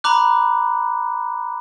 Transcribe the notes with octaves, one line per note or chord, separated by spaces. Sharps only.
A#5 B5 D6 F#6